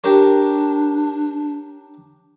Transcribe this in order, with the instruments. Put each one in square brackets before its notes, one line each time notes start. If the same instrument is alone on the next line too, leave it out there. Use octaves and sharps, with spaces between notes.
[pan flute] D4 [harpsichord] G4 A#4 C#5